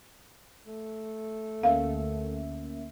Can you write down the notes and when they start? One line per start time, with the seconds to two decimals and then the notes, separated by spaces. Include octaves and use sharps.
0.66 A3
1.63 D2 A#3 C#4 E5 F5